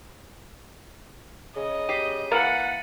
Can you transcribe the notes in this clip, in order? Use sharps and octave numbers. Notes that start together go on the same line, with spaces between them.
C#3 D#5
G4 B6 C7 D#7
E3 A#3 F#5 A6 C#7 F#7